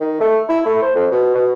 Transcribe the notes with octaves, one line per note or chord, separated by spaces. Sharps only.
D#3
A3
E4
A3
C5
F2
B2
B2